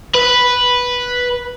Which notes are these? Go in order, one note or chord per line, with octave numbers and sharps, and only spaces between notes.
B4